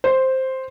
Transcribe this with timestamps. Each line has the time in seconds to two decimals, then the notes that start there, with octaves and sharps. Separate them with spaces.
0.04 C5